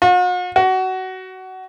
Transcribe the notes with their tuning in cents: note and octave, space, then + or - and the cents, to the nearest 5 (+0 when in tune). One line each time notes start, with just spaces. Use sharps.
F#4 -45
F#4 +20